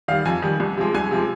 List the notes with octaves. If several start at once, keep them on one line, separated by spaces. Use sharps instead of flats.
D#3 G3 F5
F2 G#5
D#3 G3
C2
C3 F3 G#3
C2 G#5
C3 F3 G#3